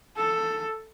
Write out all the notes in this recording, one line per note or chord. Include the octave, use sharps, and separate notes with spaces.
A4